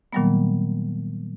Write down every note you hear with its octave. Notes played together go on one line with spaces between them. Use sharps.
A#2 D#3 F#3 G3 A#3 B3